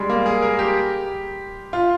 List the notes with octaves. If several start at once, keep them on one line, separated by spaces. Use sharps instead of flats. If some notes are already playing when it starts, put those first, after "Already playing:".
Already playing: G3 G#3
A#3
G#4
A#4
G4
F4